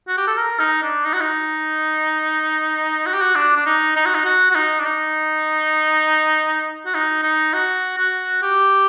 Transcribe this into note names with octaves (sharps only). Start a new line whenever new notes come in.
F#4
G4
A4
A#4
D#4
D4
D#4
F#4
D#4
F#4
G4
F#4
D4
D4
D#4
D#4
F#4
D#4
F#4
F#4
D#4
D4
D#4
F#4
D#4
D#4
F#4
F#4
G4